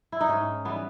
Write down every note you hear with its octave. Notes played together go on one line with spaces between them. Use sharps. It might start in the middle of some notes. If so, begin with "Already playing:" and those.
E4
D#4
G#2 C#4
E3 G3 B3